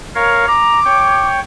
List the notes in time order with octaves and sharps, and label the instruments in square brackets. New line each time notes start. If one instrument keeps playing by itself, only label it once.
[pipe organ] A#4 C#5 F5
[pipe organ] A#5 [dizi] D6
[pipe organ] C#5 G5